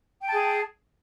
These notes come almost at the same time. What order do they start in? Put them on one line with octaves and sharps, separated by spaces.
G5 A5 G#4